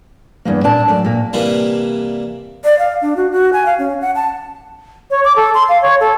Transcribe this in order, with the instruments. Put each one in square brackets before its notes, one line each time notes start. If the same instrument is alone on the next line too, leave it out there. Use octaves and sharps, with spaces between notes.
[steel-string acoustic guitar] E2 G2 A#3
A#2 D4 A5
F#2 A3 D5
A#2 A#3
[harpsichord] C3 E3 G3 A#3 D4
[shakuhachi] D5
F5
D4
F#4
F#4
G#5
F5
C#4
F#5
A5
[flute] C#5
D6
A4
C6
F5
C#5
A4